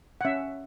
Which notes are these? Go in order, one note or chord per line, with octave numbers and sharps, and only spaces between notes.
F#5
C#4 E5